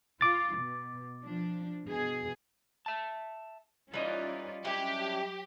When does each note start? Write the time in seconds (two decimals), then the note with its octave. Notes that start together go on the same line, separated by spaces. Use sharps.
0.21 F4 D6 A6
0.57 B2
1.22 F3 D4
1.85 B2 G#4
2.86 E5 A5
3.94 E3 G3 C#4 D#4 F4 D5 D#5
4.65 F#3 C#4 D4 E4 G4